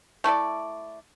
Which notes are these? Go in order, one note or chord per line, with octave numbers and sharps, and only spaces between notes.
A3 E4 A4 D5